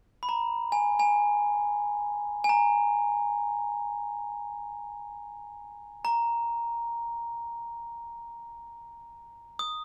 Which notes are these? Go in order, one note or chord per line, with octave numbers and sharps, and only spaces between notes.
B5
A#5
G#5
G#5
G#5
A#5
A#5
D#6